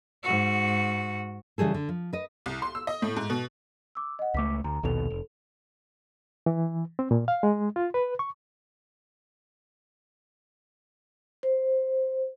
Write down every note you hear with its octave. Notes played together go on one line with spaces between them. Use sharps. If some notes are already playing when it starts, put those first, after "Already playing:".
G#2 F#4
C#3 E3 G3 G#4 A4
D3
F3
B4 D#5
C2
C6
E6
D#5
A2
G#2
B2
D6 E6
D#5 F#5
C#2 A3 D6 B6
D2 A#5
A#1 D#2 B2 A4 F7
F1
E3
C4
A#2
F5
G#3
F4
B4
C#6
C5